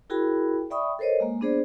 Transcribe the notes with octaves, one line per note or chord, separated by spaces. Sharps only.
E4 F#4 G#4 A#4 G5 B5
D5 E5 G5 B5 C#6 D#6
A4 A#4 C5 C#5 D#5
G#3 A#3
B3 D4 G#4 C5 D5